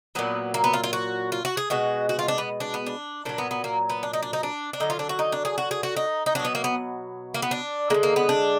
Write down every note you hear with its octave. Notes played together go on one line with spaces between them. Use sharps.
A#2 F#3 B3
A#3
B3
F4
F4
F#4
F4
F#4
G#4
B2 G#3 F#4
F#4
F4
D4
B3
D4
B3
D4
A#2 F#3 D4
B3
B3
A#3
B3
D4
D#4
D4
D#4
D4
D4
D3 F#3 D#4
F4
D4
F#4
D#4
D4
G#4
F#4
G#4
F#4
D#4
D#4
B2 F#3 D4
B3
A#3
B3
A#3
B3
D4
D3 G#3 A#3
A#3
B3
D4